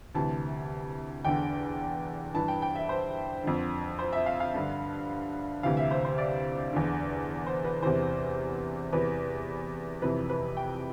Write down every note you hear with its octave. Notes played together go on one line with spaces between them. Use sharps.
D2 C3 E3 A5
E2 D3 G5
G2 E3 A5
G5
G5
E5
C5
F2 D3
C5
E5
F5
F5
G2 D3
D2 C3 E3 F5
E5
C5
C5
D5
E2 D3
C5
B4
E2 C3 E3 C5
E2 C3 E3 B4
F2 C3 E3 B4
B4
G5